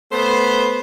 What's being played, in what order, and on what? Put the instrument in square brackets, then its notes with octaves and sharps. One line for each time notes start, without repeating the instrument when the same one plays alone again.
[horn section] A3 B3 C5